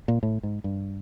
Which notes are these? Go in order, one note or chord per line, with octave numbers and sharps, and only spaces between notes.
A#2
A2
G#2
G2